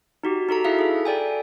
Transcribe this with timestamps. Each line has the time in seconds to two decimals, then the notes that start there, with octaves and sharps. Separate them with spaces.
0.24 D#4 F#4 G4
0.49 D#4 F#4 A4 A#5
0.64 E4 G#4 E5 F5
0.79 G#4 A4
1.05 A4 D5 G5 G#5